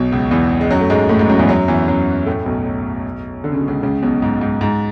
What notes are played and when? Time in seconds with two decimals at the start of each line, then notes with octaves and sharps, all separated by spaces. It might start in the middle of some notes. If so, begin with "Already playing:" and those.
Already playing: B1 B2
0.12 C#2 C#3
0.31 E2 E3
0.61 G#3
0.71 F#2 F#3
0.81 A3
0.90 G#2 G#3
1.09 A2 A3
1.19 G#2 G#3
1.29 F#2 F#3
1.39 E2 E3
1.48 F#2 F#3
1.68 E2 E3
1.88 F#2 F#3
2.26 A2 A3
2.46 B1 B2
3.44 D3
3.52 C#3
3.60 B2
3.68 C#2 C#3
3.83 C#2 C#3
4.03 B1 B2
4.22 G#2
4.41 G#2
4.61 G#2